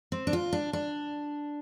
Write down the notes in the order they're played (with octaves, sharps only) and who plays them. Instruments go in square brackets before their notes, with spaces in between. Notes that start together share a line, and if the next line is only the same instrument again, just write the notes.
[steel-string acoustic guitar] C4
D4
F4
D4
D4